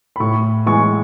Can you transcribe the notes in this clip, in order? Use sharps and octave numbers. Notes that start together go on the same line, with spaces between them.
B5
A2 C#6
E3 G#3 C#6